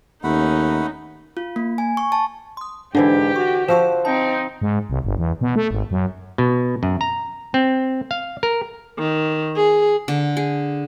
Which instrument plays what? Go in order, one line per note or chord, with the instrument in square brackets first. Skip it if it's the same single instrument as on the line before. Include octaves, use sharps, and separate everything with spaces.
[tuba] D#2 [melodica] A3 F#5 B5 [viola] C#4 D#4
[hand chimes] F4
A#3
G#5
C#6
A5
[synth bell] C6 D#6
[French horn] G#2 [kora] D3 E3 E4 [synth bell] D4 C5 [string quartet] G4
[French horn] F#4 [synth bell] C#6
[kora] F3 F#4 [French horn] C5 [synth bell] C#6 E6 E7
[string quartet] C4 D#4 [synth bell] A5
[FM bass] G#2
C2
G1
E2
B2
A3
G#1
F#2
[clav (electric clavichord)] B2
F#2
A#5
C4
F5
A#4
[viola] D#3
G#4
[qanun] D3
G#4